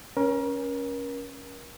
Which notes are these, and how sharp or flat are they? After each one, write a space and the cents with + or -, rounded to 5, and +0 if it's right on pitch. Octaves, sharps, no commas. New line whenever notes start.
C#4 +0 A#4 +35